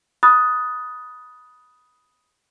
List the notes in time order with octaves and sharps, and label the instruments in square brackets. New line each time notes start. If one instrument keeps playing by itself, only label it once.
[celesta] B5 D#6 F#6 A6